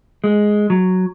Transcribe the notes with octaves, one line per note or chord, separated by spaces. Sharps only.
G#3
F#3